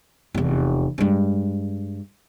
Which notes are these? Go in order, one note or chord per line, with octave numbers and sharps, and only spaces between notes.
F1 E2
G2 G#3